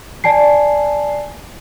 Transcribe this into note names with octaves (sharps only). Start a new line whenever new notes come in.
D5 G#5 A5 C7